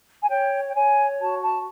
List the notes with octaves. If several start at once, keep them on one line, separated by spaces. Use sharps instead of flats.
G#5
C#5 G5
G5
C#5 G#5
F#4 A5
A5